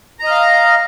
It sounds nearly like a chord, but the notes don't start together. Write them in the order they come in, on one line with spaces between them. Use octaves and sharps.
A#5 D#5 F6 F5